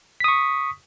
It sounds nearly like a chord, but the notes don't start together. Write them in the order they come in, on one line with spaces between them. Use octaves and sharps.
B6 D#6 C#6